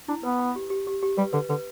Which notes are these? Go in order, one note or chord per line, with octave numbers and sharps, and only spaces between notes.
D4 E4
B3 B4
B5
G4
G4
G4
G4
G3 B4
D3 B4
D3 B4